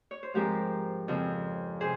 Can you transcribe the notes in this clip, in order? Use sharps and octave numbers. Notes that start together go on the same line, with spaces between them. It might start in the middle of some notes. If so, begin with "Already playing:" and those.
C#5
C5
G#2 F3 G#3 C4 G4 A#4
F2 C#3 F3 C4
C3 G#4 C5